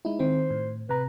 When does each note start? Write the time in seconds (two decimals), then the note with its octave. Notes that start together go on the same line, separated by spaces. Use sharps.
0.05 G#3 D#4 E4
0.19 D#3 C4 C5
0.50 A2
0.89 C3 B4 A#5